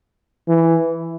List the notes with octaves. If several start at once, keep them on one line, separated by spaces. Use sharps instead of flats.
E3